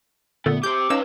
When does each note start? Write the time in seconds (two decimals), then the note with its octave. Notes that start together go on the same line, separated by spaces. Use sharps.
0.46 A#2 D3 A3 B3
0.63 G4 C5 D6 G6
0.90 C#4 D#4 B4 F5 E6